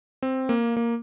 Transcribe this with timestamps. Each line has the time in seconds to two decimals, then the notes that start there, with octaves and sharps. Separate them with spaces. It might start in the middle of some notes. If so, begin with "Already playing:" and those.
0.22 C4
0.49 A#3
0.77 A#3